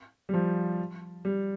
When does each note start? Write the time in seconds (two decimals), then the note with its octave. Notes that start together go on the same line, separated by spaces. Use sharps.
0.29 G3
0.34 F3
1.25 G3